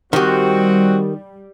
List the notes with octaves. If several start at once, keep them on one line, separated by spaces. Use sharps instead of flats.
D#3 G3 C4 F#4 G4